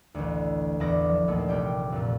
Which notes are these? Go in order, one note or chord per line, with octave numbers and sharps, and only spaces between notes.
A1 D2
A1 E2 E4 D5 D6 A#6
F3
A#1 D#2 A3
F1 G4 G5
F2 A#2